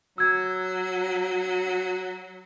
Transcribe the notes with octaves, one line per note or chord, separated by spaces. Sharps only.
F#3 E6 G#6